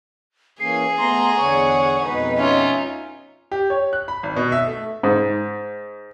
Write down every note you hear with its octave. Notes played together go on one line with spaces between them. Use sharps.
E3 A#3 C#4 G#4 C7
A3 B3 A#5 C6
E2 D3 C#5 F#5 C#6
F2 B2 G#3 D#4 B4
C#4 D#4 F4 E5
G4
C#5
F#6
B5
G#1
B2
E5
A3
G#2